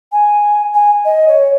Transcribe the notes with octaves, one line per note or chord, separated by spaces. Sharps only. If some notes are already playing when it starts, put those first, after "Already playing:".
G#5
G#5
D#5
C#5